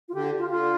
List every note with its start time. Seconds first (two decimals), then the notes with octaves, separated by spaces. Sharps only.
0.09 F4
0.14 D3 G4
0.38 F4
0.50 D3 F4